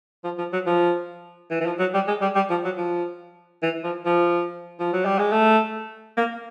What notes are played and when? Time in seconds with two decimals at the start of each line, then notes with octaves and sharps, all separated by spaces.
0.24 F3
0.38 F3
0.53 F#3
0.66 F3
1.51 E3
1.61 E3
1.66 F3
1.79 F#3
1.94 G3
2.08 G#3
2.22 G3
2.35 G3
2.50 F3
2.64 F#3
2.78 F3
3.63 E3
3.84 F3
4.06 F3
4.79 F3
4.93 F#3
5.05 G3
5.19 G#3
5.32 A3
6.17 A#3